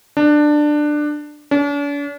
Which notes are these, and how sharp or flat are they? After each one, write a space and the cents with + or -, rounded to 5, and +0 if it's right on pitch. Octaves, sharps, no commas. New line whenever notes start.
D4 +15
D4 -45